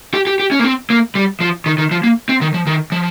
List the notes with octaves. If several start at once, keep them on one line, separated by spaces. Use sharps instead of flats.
G4
G4
G4
C#4
A#3
C4
A#3
G3
F3
D#3
D#3
F3
A#3
C4
D#3
F3
D#3
F3